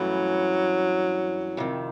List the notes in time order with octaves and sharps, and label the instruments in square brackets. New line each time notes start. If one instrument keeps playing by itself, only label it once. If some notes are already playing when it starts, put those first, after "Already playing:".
Already playing: [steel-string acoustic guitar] G2 E3 A3 C#4 [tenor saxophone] F#3
[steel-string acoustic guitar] F2 C3 D#3